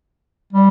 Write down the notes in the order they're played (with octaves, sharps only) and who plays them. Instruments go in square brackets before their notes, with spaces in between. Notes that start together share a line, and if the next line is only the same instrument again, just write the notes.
[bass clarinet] G3